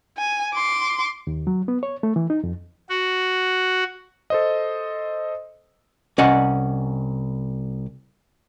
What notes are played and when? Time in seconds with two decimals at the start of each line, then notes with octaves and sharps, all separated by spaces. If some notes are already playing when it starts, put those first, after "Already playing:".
0.17 G#5
0.54 C6 D6
1.27 D#2
1.47 F#3
1.68 B3
1.83 C#5
2.03 A3
2.16 E3
2.30 D#4
2.44 F2
2.90 F#4
4.30 A4 C5 D#5
6.18 C2 C#4 D5 D#5 F#5